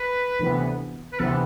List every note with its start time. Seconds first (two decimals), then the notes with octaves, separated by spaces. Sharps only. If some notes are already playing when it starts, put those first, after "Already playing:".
Already playing: B4
0.39 D2 C3 E3 B3
1.13 B4
1.19 D2 C3 E3 B3 A4